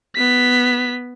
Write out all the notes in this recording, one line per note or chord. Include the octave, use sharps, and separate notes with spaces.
B3 B6